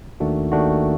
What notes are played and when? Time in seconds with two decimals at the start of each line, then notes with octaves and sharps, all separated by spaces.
0.20 D#2 D#3 A3 D4 F#4
0.52 D#2 D#3 A3 D4 F#4